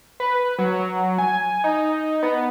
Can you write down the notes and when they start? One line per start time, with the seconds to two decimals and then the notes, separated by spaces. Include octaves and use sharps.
0.20 B4
0.59 F#3
1.18 G#5
1.64 D#4
2.23 B3